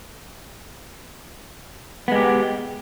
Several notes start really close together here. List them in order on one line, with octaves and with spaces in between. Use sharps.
B3 G#3 G4